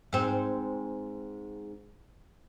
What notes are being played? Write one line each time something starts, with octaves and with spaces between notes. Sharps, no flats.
G#2 C4